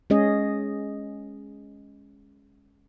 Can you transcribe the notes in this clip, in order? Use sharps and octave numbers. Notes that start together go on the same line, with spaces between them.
G#3 C#4 G#4 D#5